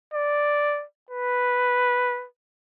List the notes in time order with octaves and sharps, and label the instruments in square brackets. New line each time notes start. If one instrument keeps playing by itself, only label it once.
[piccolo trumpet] D5
B4